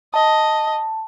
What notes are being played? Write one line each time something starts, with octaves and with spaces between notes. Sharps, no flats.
D#5 A5